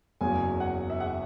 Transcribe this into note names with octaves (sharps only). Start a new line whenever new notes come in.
F#1 E2 C#3 F#3 G#5
F#5
E5
F#5